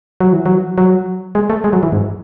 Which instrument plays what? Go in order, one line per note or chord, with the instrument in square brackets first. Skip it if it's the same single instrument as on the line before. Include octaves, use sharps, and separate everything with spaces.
[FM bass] F#3
E3
F#3
F#3
G#3
A3
G#3
F#3
E3
G#2